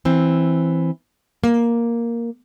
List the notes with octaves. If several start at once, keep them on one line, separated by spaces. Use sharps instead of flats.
E3 C4
A#3